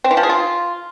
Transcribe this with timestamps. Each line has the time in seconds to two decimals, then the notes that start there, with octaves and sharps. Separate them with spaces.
0.04 C4
0.11 E3
0.17 F3
0.23 G#4
0.30 F4